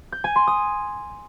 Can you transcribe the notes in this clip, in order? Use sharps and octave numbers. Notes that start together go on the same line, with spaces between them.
G6
G#5
C6
D#6